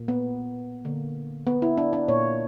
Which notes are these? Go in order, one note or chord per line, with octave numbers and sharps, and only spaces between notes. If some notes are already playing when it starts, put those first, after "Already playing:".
Already playing: A#2 A#3
B3
D3 A#3
B3
E4
D4
D4
A#2 A#3 C#5